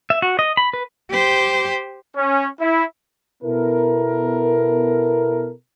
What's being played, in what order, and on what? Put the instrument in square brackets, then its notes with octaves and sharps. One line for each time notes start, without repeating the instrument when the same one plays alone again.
[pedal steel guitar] E5
F#4
D#5
B5
B4
[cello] G4 C5
[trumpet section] C#4
E4
[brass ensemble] B2 B3 E4 A4 A#4